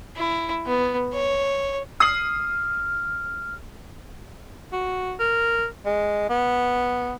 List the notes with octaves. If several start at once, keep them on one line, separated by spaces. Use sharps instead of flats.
E4
B3
C#5
D#6 F6 C7 F#7
F#4
A#4
G#3
B3